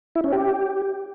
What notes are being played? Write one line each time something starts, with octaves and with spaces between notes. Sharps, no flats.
E4
C#4
G4